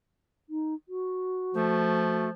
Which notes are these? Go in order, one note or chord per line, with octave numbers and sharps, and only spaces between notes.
D#4
F#4
F3 A3